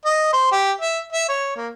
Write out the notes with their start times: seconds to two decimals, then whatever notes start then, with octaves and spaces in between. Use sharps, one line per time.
0.05 D#5
0.33 C5
0.52 G4
0.81 E5
1.13 E5
1.29 C#5
1.57 A#3